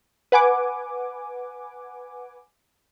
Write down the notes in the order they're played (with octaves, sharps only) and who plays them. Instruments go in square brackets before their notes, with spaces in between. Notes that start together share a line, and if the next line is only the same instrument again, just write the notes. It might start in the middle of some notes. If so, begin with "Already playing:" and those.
[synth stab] B4 F#5 G#5 D6